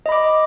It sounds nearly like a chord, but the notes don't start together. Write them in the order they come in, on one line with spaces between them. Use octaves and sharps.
D#5 B5 D6